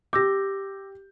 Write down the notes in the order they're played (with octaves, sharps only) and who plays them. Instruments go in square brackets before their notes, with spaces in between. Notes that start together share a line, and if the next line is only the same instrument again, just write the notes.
[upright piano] G4 G6 [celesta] D6 E6 A#6